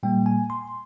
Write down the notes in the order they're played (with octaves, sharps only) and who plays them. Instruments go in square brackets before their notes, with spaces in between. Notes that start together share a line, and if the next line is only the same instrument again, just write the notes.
[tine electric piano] A#2 G3 A#3 G5
G#5
C6